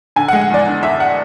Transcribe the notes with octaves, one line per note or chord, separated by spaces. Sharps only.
D3 G#5
F#5
G#3
F#5
E2 D5
D3
E1 E5
F#5